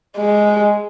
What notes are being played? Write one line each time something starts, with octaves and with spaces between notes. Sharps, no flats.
G#3